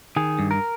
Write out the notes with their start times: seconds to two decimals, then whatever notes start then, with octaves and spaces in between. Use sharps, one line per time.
0.16 D#3 G#4
0.39 G2
0.51 A#4